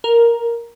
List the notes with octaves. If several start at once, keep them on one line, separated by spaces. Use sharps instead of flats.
A#4